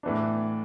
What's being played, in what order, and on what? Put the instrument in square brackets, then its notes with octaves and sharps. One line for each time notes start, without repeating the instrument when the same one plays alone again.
[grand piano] A2 E3 B3 D4